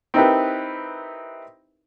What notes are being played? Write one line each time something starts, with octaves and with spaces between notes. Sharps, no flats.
C4 D#4 E4 G4 A#4 B4